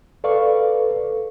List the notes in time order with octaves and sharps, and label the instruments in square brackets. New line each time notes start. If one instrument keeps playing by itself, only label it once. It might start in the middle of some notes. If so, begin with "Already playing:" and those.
[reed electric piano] A4 B4 D5 F5 C#6